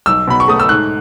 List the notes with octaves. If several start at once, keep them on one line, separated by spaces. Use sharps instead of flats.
B1 E6
B2 B5
C#6
A3 D#6
E6
G#2 F#6